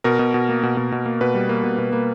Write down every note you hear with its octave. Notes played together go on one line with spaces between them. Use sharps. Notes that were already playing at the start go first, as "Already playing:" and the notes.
B2 A#4
B2
B2
A#3
B2
B2
B2
A#3
B2 B4
G3
A#3
B2
B2
A#3